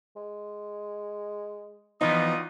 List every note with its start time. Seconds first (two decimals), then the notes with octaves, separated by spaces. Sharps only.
0.16 G#3
2.01 E3 F3 G3 B3 D#4 F4 F#4 D#6